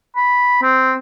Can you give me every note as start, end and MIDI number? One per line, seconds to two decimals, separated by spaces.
0.16 0.60 83
0.62 0.94 60